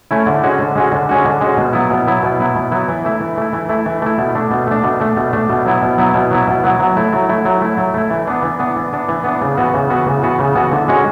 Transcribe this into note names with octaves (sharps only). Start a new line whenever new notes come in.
A3 C#4 E4
D3
G#3 C#4 F#4
D3
G#3 C#4 F#4
D3
G#3 C#4 F#4
D3
G#3 C#4 F#4
B2
F#3 B3 E4
B2
F#3 B3 E4
B2
F#3 B3 E4
B2
F#3 B3 E4
E3
A3 E4
E3
A3 E4
E3
A3 E4
E3
A3 E4
B2
A3 D4
B2
A3 D4
B2
A3 D4
B2
A3 D4
B2
F#3 B3 E4
B2
F#3 B3 E4
B2
F#3 B3 E4
B2
F#3 B3 E4
F#3
A3 E4
F#3
A3 E4
F#3
A3 E4
F#3
A3 E4
E3
B3 D4
E3
B3 D4
E3
B3 D4
E3
B3 D4
C#3
E3 B3 F#4
C#3
E3 B3 F#4
C#3
E3 B3 F#4
C#3
E3 B3 F#4
D3
G#3 C#4 F#4